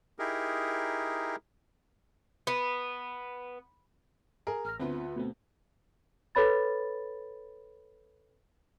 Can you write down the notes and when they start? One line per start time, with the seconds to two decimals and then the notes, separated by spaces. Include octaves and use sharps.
0.19 D#4 E4 G4 G#4 A#4
2.47 B3
4.47 G#4 A#4
4.65 A1 A#5 F6
4.80 D2 B3 C4 F4 B4
5.16 B2 A3 C4
6.35 A4 B4 C#5 B5 A6